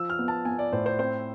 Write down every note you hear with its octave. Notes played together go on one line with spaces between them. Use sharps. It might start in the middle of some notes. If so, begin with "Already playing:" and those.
Already playing: F3 E6
F6
B3
A5
B3 G#5
D5
A2 C5
C5
C4 C5